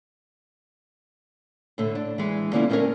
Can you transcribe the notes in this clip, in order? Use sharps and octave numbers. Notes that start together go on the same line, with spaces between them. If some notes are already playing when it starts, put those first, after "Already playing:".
A2 D3 A3
D4
E3 G#3
D3 A#3 B3 C#4 E4 F4
A3 B3 C#4 D4 A#4 C#5